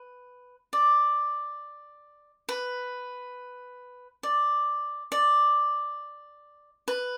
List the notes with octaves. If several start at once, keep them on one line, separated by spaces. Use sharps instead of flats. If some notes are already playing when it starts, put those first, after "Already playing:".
Already playing: B4
D5
B4
D5
D5
B4